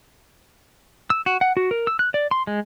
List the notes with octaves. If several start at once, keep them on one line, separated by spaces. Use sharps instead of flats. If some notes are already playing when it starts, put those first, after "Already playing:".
E6
F#4
F#5
F#4
A#4
E6
F#6
D5
C6
G#3